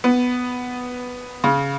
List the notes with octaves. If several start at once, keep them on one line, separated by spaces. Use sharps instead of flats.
B3
C#3